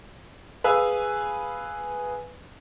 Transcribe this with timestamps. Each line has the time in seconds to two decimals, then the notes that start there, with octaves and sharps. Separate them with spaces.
0.64 G#4 B4 F5 G#5 E6